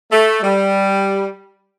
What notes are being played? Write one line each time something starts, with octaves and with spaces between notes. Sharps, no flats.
A3
G3